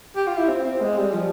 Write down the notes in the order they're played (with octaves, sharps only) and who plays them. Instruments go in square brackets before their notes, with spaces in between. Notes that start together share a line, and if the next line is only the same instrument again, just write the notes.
[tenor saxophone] G4
F4
E4
C4
C4
G#3
G3
F3